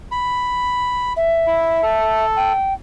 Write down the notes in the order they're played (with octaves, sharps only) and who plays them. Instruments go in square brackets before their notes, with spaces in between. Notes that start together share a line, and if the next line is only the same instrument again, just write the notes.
[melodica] B5
[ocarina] E5
[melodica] E4
A4
[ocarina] G5